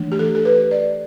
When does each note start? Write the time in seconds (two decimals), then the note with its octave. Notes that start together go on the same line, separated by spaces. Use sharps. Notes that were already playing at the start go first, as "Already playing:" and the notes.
Already playing: E3 A3 D4
0.12 G4
0.19 A4
0.35 A4
0.45 B4
0.71 D5